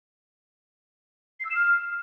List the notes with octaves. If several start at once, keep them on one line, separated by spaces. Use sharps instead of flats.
C7
E6
E7
F6